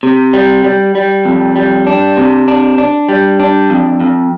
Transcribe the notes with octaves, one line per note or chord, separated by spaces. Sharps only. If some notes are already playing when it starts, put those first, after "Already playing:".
C3
G3
G3
G3
F2
G3
D4
C3
D4
D4
G3
D4
F2
F2